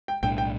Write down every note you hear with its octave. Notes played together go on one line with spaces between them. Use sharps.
G5
B1 A2 G3 D4 G5
G5